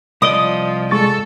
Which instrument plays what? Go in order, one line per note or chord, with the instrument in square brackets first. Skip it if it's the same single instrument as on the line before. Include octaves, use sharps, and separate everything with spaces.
[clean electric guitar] C2 D5 D#5 [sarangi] F3 [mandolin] D#6
[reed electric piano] G#3 C#6 A6 [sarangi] A4